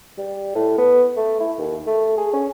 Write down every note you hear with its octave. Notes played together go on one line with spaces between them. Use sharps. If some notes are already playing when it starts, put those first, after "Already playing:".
G3
A2
B3
A3
E4
D#2
A3
G#4
C#4